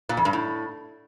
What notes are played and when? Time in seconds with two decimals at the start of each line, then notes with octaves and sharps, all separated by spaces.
0.09 A#2
0.17 F2
0.25 G2
0.33 A2